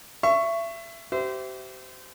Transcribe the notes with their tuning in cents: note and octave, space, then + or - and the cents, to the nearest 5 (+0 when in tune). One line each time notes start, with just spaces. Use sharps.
E5 +30 C#6 +0
G4 -35 C5 -25 E5 +5